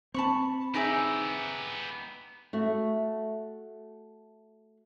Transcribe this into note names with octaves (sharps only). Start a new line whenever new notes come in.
C4 A5 B5 C#6
B3 D#4 G4 G#4 E5
A3 F#4